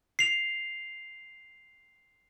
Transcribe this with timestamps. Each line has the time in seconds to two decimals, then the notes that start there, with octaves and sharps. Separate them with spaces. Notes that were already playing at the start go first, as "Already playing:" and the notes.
0.19 C7 F7